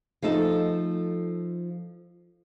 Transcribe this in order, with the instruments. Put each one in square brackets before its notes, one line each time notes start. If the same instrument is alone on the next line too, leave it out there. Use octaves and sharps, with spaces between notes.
[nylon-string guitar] F3 A3 D#4 A4